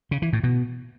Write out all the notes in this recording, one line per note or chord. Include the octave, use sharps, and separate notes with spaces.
C#3
E3
A2
B2